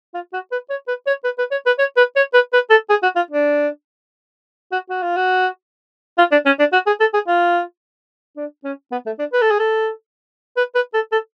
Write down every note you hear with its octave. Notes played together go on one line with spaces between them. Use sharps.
F4
F#4
B4
C#5
B4
C#5
B4
B4
C#5
B4
C#5
B4
C#5
B4
B4
A4
G#4
F#4
F4
D4
F#4
F#4
F4
F#4
F4
D4
C#4
D4
F#4
G#4
A4
G#4
F4
D4
C#4
B3
A3
D4
B4
A4
G#4
A4
B4
B4
A4
A4